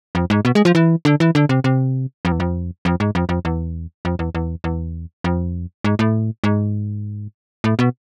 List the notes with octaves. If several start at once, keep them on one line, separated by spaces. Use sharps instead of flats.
F2
G#2
B2
G#3
F3
E3
D3
E3
D3
C3
C3
F2
E2
F2
F2
G#2
F2
F2
E2
F2
E2
E2
E2
F2
G#2
A2
G#2
A2
B2